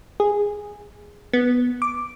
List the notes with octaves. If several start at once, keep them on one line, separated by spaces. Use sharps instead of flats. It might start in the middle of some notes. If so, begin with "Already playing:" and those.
G#4
B3
D6